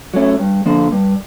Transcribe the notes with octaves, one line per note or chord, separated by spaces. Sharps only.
F#3 A3 C#4
G2
D3 F3 A#3
G2